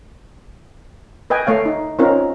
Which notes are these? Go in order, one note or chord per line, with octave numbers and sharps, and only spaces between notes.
B4 D#5 G5 G#5
A3 C#5 F5
D#4
C4 C#4 D#4 F4 A#4